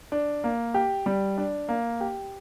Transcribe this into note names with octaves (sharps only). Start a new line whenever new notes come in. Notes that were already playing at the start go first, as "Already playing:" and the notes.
D4
A#3
G4
G3
D4
A#3
G4